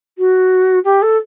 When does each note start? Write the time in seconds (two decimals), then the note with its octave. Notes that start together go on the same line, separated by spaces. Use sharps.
0.18 F#4
0.84 G4
1.02 A4